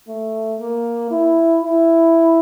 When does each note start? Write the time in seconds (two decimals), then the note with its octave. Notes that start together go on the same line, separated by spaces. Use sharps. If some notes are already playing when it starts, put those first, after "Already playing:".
0.08 A3
0.60 A#3
1.11 E4
1.63 E4